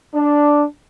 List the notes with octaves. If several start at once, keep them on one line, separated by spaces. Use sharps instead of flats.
D4